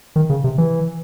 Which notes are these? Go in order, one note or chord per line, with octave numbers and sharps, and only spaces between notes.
D#3
C#3
C3
E3